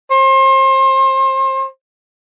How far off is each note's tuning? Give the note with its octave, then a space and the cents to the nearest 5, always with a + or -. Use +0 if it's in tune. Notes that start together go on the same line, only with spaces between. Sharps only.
C5 +35